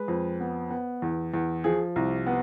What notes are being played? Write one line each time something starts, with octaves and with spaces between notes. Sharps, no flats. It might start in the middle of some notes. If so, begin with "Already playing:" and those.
Already playing: G#3 B4
F2
B3
B3
E2
E2
F3 G#4
C2
B3